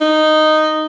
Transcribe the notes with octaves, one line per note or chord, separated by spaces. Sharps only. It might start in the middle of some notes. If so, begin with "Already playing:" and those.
D#4